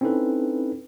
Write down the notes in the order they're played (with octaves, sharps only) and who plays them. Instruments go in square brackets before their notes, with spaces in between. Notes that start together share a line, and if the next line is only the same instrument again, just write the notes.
[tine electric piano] C4 C#4 D#4 E4 A4 B4